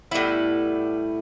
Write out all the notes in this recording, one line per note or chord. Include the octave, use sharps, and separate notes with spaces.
A2 G3 B3 E4